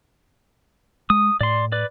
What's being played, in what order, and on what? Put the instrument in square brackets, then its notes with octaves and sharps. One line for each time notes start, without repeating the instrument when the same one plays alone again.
[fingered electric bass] G#3 [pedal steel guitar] D#6
[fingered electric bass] A2 [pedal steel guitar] D5 C6
[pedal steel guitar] B4 D5